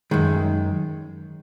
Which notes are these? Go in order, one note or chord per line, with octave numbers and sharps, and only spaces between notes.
F#2 D#3 G#3